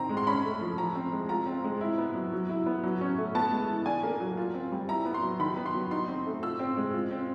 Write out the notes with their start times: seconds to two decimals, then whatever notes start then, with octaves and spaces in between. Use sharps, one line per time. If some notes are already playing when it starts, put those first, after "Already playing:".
Already playing: D#3 C4 A#5
0.09 G#3
0.17 C6
0.27 C#4 B5
0.44 A3
0.61 F3
0.78 F3 A#5
0.95 C4
1.12 G#3
1.29 F4 A#5
1.46 C4
1.64 G#3
1.81 E4
1.98 B3
2.15 F#3
2.32 F#3
2.49 E4
2.66 B3
2.83 F#3
3.01 C#4
3.17 A3
3.35 B3 A5
3.52 G#3
3.69 E3
3.86 D4 G#5
4.03 A#3
4.20 F#3
4.37 F4
4.54 C4
4.72 G3
4.89 E4 A#5
5.05 B3
5.14 C6
5.22 F#3
5.39 D#3 B5
5.57 B3
5.66 C6
5.74 F#3
5.91 D#4 C6
6.08 C4
6.26 A3
6.43 F4 E6
6.59 C4
6.77 G#3
6.93 F4
7.11 C4